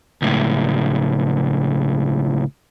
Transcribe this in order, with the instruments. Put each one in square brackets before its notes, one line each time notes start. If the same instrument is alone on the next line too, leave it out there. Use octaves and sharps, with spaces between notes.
[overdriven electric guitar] C#2 A2